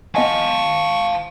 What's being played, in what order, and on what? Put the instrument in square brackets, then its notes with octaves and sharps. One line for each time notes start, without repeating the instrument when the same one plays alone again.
[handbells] B3 D#5 G#5 [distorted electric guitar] F5 A5 [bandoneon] C#6